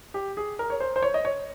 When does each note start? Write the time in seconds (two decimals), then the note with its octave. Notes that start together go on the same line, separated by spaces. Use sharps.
0.14 G4
0.37 G#4
0.59 A#4
0.70 C#5
0.80 C5
0.96 C5
1.02 C#5
1.14 D#5
1.25 C#5